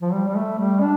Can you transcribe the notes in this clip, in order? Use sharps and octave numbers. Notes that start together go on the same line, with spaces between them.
F3
G3
G3
A3
G3
D4